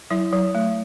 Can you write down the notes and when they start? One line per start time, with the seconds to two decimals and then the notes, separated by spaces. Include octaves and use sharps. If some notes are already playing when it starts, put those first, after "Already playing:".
0.10 F#3 E4 E5
0.33 F#3
0.55 A3